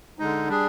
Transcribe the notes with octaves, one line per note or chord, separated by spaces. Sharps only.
D3 G#3 D#4
G3 D4 G#4